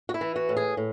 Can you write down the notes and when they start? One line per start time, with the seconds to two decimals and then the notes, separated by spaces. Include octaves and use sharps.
0.09 F#4
0.14 E4
0.21 E3
0.36 F#4
0.49 A2
0.57 G#4
0.77 A2